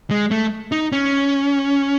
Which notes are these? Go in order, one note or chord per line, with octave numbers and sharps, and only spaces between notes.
G#3
A3
D#4
C#4